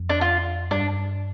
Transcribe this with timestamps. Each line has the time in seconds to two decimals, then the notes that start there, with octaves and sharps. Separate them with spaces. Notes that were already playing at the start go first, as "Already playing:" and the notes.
Already playing: F2
0.10 D4
0.21 F4
0.71 G2 D4